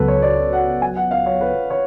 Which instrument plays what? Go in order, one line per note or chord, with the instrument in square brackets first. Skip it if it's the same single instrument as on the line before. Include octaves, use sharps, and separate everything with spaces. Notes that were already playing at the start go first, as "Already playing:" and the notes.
Already playing: [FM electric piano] C#2 C#3 F#3 B3 F#4 [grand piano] A4 B4
[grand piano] C#5
D5
F#5
G#5
F#5
F5
C#5
B4
C#5